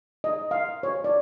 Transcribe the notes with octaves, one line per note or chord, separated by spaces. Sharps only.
D#5
F5
C#5
D5